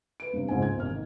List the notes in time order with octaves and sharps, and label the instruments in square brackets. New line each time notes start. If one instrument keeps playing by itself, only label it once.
[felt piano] B4 D7
G2 C3
C#2 G#2 C4 G#5
G#6
G#1 C3 F6
D#3